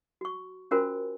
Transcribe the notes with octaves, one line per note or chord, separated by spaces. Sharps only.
F#4 C#6
C#4 F4 F#4 A#4 C5 G#5